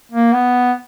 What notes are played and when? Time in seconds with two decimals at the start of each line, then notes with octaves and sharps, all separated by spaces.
0.12 A#3
0.33 B3